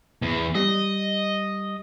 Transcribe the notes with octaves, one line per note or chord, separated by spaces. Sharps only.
E2
G3 D#5